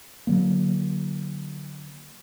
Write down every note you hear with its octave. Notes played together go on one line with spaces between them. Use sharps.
D3 F#3 A#3